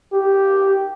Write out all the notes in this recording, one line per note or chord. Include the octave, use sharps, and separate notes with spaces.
G4